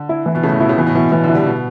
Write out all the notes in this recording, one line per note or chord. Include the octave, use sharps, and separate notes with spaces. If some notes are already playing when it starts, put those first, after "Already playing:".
Already playing: D3
E4
E3
B2
C#3 A3
A2
B2 E4
C#3
B2 E3
A2
B2 E3
A2
B2 E3
D3
E4
G3
B2